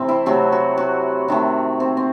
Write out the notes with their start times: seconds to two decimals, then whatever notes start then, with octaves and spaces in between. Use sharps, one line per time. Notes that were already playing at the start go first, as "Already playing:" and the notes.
Already playing: C3 E3 A3 C4
0.09 E4
0.26 C3 F#3 A3 F#4
0.52 F#4
0.78 F#4
1.28 C3 D#3 A3
1.80 C4
1.97 C4